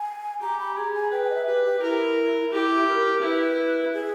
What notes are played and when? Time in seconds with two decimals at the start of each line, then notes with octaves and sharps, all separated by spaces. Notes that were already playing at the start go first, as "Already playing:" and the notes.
Already playing: G#5
0.42 G4 A#5
0.59 B5
0.76 G#4 A#5
0.94 G#5
1.12 B4 G5
1.23 G5
1.30 D#5
1.35 E5
1.46 G4 B4
1.64 G4
1.82 E4 A#4
2.52 E4 G4
2.88 A#4
3.22 E4 B4
3.93 G#4